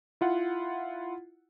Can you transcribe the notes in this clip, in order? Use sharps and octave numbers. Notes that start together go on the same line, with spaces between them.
E4 F4 F#5